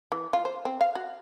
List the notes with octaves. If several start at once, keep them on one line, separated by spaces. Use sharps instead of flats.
E3
F4
C5
C4
F5
F#4